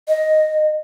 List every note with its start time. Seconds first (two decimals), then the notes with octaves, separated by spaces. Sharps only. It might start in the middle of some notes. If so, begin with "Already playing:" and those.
0.08 D#5